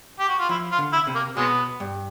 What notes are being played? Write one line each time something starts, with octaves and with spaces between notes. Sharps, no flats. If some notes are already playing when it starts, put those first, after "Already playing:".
G4
F#4
F4
F3 E4
F4
D3
E4
C3
A#3
B2 F#3 G#3 B3
G2